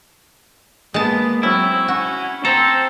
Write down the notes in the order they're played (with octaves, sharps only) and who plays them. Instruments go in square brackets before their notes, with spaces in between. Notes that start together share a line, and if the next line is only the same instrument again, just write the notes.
[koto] G#3 A5 [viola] A#3 B3
[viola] F#3 C4 [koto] C#4 [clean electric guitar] E4
[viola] C#4 [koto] F#4
[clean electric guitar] C4 A4 [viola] C5 [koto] A#5